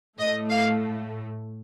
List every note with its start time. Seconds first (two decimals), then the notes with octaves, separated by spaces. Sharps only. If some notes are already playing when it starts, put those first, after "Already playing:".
0.19 A2 A3 D#5
0.51 F5